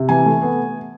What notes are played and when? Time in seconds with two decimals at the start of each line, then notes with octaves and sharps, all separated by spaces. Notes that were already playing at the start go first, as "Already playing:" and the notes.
Already playing: C3
0.09 E3 G#5
0.25 A3
0.42 B3